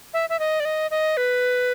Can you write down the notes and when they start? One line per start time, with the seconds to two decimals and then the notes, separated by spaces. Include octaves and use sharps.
0.14 E5
0.29 E5
0.39 D#5
0.60 D5
0.65 D#5
0.91 D#5
1.17 B4